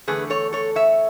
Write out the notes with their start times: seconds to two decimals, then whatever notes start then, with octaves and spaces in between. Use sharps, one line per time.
0.07 E2 D3 A3 G#4 B4
0.30 A4 C#5
0.53 A4 C#5
0.75 C#5 E5